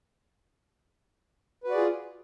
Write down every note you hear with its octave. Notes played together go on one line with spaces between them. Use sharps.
F4 F#4 G#4 B4 D5